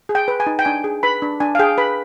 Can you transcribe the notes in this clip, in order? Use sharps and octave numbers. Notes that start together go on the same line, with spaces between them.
G#4
G5
B4
G#5
D#4
G5
D4 G#5
G#4
B4 B5
D4
D4 G#5
F5
G#4 G5
B4 B5